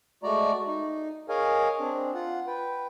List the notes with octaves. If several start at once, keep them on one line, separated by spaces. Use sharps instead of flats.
G#3 A3 F#4 D5 A#5
D#4
G#4 A#4 C#5 D#5 F5 G#5
C4 D4
F4 F#5
B4 G5